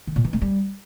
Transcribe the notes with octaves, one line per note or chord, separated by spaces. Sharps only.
D#3
A#2
E3
A3
G3